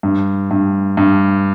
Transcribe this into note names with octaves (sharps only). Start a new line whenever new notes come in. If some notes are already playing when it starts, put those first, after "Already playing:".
G2
G2
G2